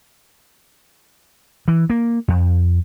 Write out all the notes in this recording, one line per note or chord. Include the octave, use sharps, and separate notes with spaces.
E3
A#3
F2